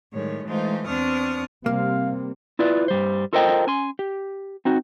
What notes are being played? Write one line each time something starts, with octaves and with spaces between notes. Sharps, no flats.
A2 D#3 G3 G#3 C#5
E3 G#3 A3 D#4 F4 C5
E2 C4 D4 C#6 D#6 F6
C3 G3 A#3 C4 F5
E4 F4 B4 D5
G2 G3 C5
F4 A4 A#4 C5 D#5 G5
C#4 G#5 C6
G4
C4 D#4 F#4